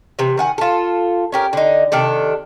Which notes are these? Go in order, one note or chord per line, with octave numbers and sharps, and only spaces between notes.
C3 E3
D#3 F#5 G#5
F4 A4
C#4 G4 A#4
D3 D#4
C3 D#3 D4 A4